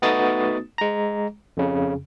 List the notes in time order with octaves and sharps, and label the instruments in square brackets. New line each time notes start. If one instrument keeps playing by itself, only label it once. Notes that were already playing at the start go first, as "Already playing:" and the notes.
[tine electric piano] A3 B3 D#4 F#4 D#6 A6
G#3 A#5
F2 C#3